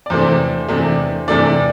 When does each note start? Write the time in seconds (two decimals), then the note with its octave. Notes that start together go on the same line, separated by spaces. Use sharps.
0.06 D5
0.10 E2 C3 A3 D4 C5
0.69 E2 C3 A3 D4
1.28 E2 C3 A3 D4 D5